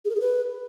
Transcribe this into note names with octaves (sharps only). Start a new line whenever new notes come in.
G#4
A#4
G#4
B4